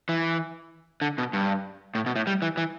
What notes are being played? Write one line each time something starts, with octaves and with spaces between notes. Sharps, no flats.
E3
D3
B2
G2
A2
B2
A2
G3
E3
E3